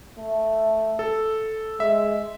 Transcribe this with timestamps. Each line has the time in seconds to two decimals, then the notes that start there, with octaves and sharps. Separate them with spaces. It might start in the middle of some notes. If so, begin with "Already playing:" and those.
0.18 A3
0.99 A4
1.79 G#3 E5